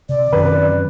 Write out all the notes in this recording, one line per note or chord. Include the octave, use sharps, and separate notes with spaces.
C3 D5
F#2 C3 D#3 B4